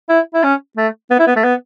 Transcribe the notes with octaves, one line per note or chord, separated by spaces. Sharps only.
E4
E4
C#4
A3
B3
E4
B3
A3
B3